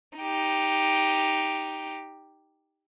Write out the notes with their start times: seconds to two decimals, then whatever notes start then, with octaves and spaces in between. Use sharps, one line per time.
0.19 D#4 G4